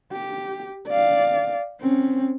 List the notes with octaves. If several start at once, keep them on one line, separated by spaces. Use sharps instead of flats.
G4
D5 F5
C4 C#4